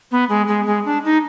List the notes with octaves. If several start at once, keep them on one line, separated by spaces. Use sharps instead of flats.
B3
G#3
G#3
G#3
D4
D#4